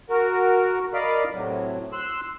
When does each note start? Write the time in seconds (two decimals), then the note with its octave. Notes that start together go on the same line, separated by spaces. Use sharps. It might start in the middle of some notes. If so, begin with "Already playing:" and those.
0.10 F#4 A#4
0.94 A#4 D5 D#5 F5 B5 D6
1.33 A2 C3 F#3
1.92 C6 E6 F#6